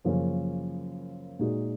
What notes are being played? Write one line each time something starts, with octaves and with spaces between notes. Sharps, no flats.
F#2 C#3 F3 A#3 C#4
A#2 G#3 D#4 F#4